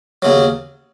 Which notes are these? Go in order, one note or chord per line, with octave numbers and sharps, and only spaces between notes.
D#2 C#3 F#3